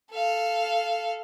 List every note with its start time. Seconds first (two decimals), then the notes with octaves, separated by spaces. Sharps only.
0.11 A4 F5